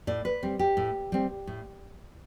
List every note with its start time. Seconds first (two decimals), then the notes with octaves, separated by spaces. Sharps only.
0.07 A2 D5
0.25 B4
0.43 G3 C4
0.59 G4
0.77 A2
1.12 G3 C4
1.47 A2